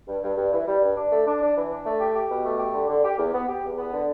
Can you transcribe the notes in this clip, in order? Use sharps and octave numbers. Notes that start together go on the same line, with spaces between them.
G2
G2
G2
E3
G3
G2
D4
A3
D4
D4
E3
D4
A3
G4
G4
B2
A3
G4
D3
D3
G4
E2
B3
G4
E2
B3
D3